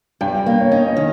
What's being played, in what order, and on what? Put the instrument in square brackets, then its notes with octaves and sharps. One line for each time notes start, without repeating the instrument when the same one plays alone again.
[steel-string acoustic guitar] G2 [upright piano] G5
[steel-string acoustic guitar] A#3
[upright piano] C#5
[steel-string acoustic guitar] C#4 [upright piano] D#5
[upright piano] D#5
[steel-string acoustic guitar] D#3